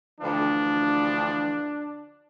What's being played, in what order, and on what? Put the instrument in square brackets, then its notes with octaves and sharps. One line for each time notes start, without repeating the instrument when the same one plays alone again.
[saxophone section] D2 E3 F3 [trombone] D4